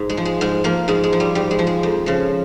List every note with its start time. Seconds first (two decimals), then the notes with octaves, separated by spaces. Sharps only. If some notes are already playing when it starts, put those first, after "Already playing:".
Already playing: G#2
0.10 G#3
0.17 F3
0.25 G#3
0.41 G#2 G#3
0.64 F3 A#3
0.88 G#2 G#3
1.04 G#3
1.13 F3
1.20 G3
1.35 G#2 G3
1.51 G#3
1.59 F3
1.67 G#3
1.83 F2
2.06 C#3 F3